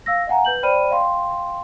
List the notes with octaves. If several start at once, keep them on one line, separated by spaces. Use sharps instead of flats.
F5 E6 A#6
D#5 F5 F#5 G#5 A#5
B4 G6 F#7
C5 D5 G5 B5 F6 D#7
D#5 F5 G5 C6